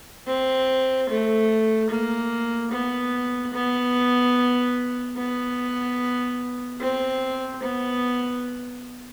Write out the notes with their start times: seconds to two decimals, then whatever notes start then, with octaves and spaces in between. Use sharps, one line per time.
0.27 C4
1.09 A3
1.90 A#3
2.72 B3
3.54 B3
5.17 B3
6.81 C4
7.63 B3